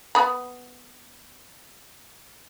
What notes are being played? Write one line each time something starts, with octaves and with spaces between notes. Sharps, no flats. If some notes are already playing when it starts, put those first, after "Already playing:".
B3 B5